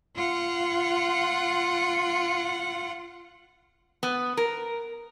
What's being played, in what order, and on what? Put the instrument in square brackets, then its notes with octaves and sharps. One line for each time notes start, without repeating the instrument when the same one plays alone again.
[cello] F4 F#5
[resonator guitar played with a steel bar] B3
A#4